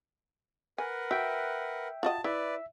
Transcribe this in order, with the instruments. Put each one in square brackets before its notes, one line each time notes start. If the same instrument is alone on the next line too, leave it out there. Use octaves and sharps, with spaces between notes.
[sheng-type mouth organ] A#4 B4 F#5 [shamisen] G#5
[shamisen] F#4 [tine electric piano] E5 G5
[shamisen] F4 F#4 D#5 [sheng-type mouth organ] A5
[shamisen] E4 [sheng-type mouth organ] B4 D5 [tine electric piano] E5